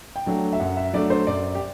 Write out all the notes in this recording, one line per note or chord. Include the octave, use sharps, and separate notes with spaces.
G5
F#3 A3 D4
E5
F#2 F#5
E5
F#3 A3 D4 D5
C5
F#2 D5
G4